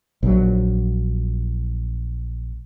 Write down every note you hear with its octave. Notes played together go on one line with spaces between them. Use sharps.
A#1 F#3